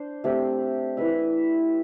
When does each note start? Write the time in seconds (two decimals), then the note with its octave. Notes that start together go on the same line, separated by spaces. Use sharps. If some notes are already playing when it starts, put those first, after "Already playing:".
Already playing: D4 C5
0.24 A3 C4 G4
0.97 E4 B4 E5